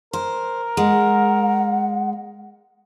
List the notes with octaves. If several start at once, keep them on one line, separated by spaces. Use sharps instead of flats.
A#4 C5
G#3 F#5